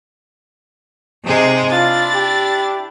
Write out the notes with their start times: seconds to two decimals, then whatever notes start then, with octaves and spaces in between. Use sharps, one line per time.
1.25 C3 G#3 D#4 G4 G#4
1.71 D4 E4 F4 A6
2.14 G4